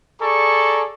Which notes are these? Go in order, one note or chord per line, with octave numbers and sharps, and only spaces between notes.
G#4 A4 D5 A#5 C#6